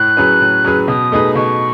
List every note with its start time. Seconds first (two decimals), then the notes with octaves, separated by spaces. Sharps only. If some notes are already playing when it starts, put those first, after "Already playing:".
Already playing: A2 F#6
0.17 F#3 C#4 G#4 B4
0.41 A2
0.65 F#3 C#4 G#4 B4
0.88 B2 D#6
1.12 A3 D#4 G#4 B4
1.35 B2 C#6